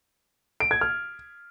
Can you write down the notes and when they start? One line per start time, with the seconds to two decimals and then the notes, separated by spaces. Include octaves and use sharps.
0.60 D7
0.71 G#6
0.81 F6